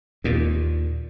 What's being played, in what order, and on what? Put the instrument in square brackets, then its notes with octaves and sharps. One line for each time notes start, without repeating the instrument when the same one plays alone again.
[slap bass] D#2 A#2